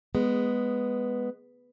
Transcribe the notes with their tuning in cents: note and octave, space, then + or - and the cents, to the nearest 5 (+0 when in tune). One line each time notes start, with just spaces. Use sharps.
G#3 +0 B3 +0